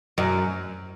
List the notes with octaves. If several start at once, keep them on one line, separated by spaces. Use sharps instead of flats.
F#2